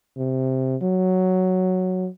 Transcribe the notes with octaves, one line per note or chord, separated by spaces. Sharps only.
C3
F#3